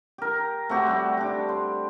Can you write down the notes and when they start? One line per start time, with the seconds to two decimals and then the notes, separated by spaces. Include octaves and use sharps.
0.18 G4 A#4
0.69 A3 C4 F#4 G4
0.87 G3 F#4
1.17 G3 D4 G4
1.49 C6